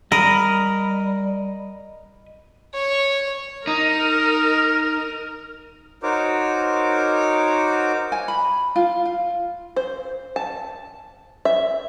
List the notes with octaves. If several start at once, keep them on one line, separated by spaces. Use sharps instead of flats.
G3 A#4 D#5 B5 D#6
C#5
D#4 A#4
D#4 F#4 A#4 C5 C#5 D6
G#5
B5
F4
F4
C5
A5
E5